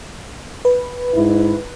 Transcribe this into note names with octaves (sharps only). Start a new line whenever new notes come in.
B4
G#2 E4